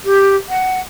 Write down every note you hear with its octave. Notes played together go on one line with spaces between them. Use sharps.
G4
F#5